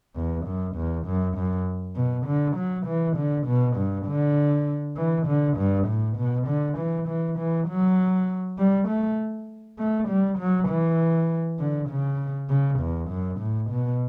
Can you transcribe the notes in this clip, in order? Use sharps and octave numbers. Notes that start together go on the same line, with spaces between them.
E2
F#2
E2
F#2
F#2
B2
D3
F#3
E3
D3
B2
G2
D3
E3
D3
G2
A2
B2
D3
E3
E3
E3
F#3
G3
A3
A3
G3
F#3
E3
D3
C#3
C#3
E2
F#2
A2
B2